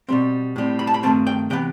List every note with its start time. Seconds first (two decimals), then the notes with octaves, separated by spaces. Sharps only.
0.09 B2 G3 C4
0.56 A2 G3 C4
0.79 B5
0.87 A5
0.94 B5
1.03 G2 D#3 A3 C4 A5
1.27 G5
1.50 C3 E3 B3 G5